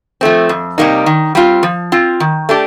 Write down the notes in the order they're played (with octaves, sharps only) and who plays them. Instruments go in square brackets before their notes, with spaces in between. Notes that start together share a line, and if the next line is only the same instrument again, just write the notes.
[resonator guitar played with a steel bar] F3 A3 C4
F2
C3 G3 A#3 D#4
D#3
G3 C4 F4
F3
C4 F4
D#3
A3 D4 G4